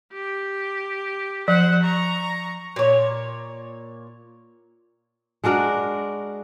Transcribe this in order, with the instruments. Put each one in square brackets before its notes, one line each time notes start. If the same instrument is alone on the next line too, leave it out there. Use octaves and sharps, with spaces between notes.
[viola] G4
[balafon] F3 [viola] C5 F#5
[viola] A#5 C#6
[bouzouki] A#2 C#5
[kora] G#3 D4 F#4 A#4